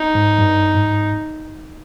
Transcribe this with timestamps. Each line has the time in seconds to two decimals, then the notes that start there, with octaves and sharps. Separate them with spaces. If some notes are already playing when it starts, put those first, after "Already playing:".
Already playing: D#4
0.15 G#2
0.39 G2
0.74 G#2